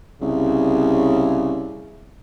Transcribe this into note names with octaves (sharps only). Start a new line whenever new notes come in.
C2 C#3